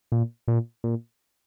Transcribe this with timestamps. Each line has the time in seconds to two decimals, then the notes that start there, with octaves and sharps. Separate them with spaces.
0.12 A#2
0.48 A#2
0.84 A#2